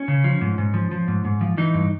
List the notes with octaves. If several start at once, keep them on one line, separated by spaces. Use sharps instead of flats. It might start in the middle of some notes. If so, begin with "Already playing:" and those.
Already playing: C#4
C#3
F3
G#2
G#2
F3
F3
G#2
G#2
F3
E3 D#4
G2